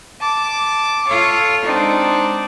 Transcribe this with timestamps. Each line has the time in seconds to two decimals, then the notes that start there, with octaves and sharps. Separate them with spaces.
0.21 A5 D6
1.08 F4 A4 C#5 F5
1.64 G#3 C4 D4 D#4